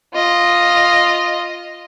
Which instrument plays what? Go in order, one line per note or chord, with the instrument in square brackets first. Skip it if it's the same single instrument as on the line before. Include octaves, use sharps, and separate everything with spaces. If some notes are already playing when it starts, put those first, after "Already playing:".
[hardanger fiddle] F4 D#5